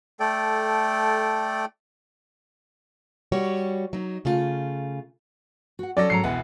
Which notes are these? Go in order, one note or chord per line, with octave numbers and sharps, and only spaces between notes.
A3 A4 D5 G5
G3 F#4 C#5
F#3 D#4
C#3 A3 F4
F#4 F#5
F#3 C#4 A4 D5 A#6
G#2 F#3 A#5 C7 C#7
E1 E3 B3 F#5